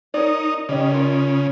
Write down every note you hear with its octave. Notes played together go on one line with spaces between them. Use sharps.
D#4 A#4 C#5 D5
C#3 G4 D5 D#5
F4 A#4